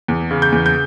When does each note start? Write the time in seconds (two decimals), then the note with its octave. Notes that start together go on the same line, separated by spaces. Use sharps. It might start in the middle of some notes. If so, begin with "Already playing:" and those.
0.08 E2
0.31 C#3
0.42 G6
0.52 E2
0.66 G6